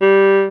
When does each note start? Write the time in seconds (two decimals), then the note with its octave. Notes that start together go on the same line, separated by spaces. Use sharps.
0.01 G3